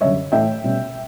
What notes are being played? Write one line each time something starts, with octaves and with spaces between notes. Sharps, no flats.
F#2 D3 G3 C#4 C#5 E5
A2 E3 A3 E5 G5
B2 G3 C#4